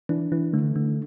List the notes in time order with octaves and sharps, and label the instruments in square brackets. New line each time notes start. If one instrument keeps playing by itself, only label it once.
[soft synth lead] E3 [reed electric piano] D4
[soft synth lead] E3
[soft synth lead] D3 [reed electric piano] A3
[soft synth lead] D3